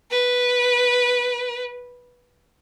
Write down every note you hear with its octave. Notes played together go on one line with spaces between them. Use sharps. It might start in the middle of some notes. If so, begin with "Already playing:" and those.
B4